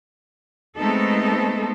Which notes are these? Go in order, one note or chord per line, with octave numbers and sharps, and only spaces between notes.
G#3 A3 B3 C4 D#4 A4